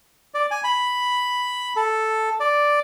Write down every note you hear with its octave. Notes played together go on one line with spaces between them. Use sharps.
D5
G#5
B5
A4
D5